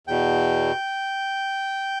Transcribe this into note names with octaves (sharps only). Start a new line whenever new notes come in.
E2 B2 G5